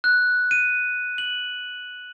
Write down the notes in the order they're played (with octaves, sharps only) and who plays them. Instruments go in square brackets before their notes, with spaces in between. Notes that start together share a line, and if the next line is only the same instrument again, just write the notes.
[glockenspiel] F#6
D#7
F#7